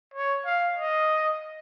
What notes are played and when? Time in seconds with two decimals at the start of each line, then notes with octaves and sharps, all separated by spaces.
0.14 C#5
0.46 F5
0.77 D#5